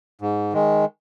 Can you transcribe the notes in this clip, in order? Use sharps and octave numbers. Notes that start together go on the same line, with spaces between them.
G#2
D#3 G#3